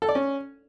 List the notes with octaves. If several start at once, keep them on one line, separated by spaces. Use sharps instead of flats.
A4
D5
C#4